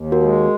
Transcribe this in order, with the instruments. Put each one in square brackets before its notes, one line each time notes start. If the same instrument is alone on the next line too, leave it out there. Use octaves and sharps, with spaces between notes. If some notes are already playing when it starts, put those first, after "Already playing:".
Already playing: [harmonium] D#2
[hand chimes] F#4 A#4
[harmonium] G#3